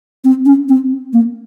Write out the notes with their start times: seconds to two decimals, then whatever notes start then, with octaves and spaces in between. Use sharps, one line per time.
0.24 C4
0.45 C#4
0.69 C4
1.13 A#3